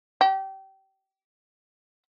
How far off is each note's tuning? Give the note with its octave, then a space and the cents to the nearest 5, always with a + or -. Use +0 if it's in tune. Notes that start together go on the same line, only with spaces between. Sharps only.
G4 -25